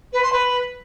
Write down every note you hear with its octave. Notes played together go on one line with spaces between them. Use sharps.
B4
C6
B4